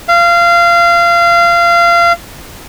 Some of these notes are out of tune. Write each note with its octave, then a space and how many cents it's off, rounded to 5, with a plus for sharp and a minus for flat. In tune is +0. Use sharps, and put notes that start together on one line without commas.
F5 -25